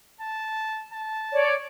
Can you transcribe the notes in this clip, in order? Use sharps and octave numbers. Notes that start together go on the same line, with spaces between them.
A5
A5
C#5 D5